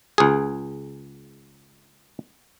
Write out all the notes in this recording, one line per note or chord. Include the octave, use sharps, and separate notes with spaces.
C#2 G#4